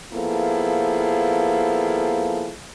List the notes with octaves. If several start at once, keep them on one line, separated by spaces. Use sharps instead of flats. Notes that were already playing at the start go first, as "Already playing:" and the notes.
F3 A#3 B3 E4 G#4 A4